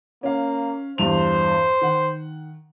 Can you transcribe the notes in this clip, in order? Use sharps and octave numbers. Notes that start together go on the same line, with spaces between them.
A#3 C#4 F5
E2 G2 C5 F7
D#3 F#5